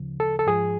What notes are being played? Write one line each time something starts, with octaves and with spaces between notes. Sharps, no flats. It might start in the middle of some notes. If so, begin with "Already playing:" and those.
Already playing: D2 C#3 F3
A4
A4
G#2 F3 G#4